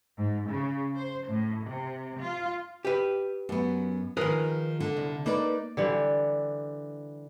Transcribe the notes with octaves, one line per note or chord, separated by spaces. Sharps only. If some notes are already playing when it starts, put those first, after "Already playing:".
G#2
C#3
C5
A2
C3
F4
G4 B4
F#2 B3
D#3 F3 G#4 A#4 B4
D3
C2
A#3 D#4 B4 D5
D3 E3 G3